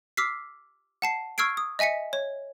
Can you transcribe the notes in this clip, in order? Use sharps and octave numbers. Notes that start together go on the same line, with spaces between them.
D6 E6 F6 B6 C7
F#5 A5 C7
C#6 E6 F6 G#6 C7 D7
D#6
D#5 E5 G#5 B6 C#7
C#5